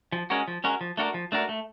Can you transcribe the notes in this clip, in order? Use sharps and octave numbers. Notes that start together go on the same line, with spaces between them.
F3
G#3 C#4 F#4 A#4
F3
G#3 C#4 F#4 A#4
F3
A3 D4 F#4 A#4
F3
A3 D4 F#4 A#4
A3